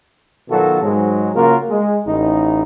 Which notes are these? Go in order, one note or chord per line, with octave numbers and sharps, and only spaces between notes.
B2 D#3 F#3 F4 F#4 A4
G#2 F#3 G#3
C#3 A#3 F4 F#4 A#4
G#3
A1 D#4